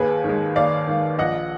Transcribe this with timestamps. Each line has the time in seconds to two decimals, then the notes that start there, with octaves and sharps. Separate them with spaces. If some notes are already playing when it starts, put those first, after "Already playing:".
Already playing: D#2 G#4 B4
0.24 D#3
0.29 G#3
0.55 D#2 D5 F5
0.87 D#3 G#3
1.18 A#1 D#5 F#5